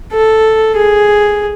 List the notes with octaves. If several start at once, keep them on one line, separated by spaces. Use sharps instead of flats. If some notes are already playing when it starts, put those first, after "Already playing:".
A4
G#4